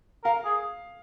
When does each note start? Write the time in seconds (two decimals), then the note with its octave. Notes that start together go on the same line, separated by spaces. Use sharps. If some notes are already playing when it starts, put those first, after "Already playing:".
0.24 A#4 F5
0.45 G#4